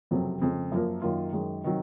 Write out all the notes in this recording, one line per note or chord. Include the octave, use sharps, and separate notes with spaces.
F#1 F2 C3 F#3
F2 C#3 G#3
F#2 F3 A#3
F#2 D#3 A#3 F4
F#2 D#3 G#3
C3 D#3 F#3